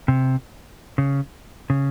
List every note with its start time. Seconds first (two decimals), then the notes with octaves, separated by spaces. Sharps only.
0.08 C3
0.98 C#3
1.70 C#3